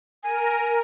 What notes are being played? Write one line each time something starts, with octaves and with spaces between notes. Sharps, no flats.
A#4 G#5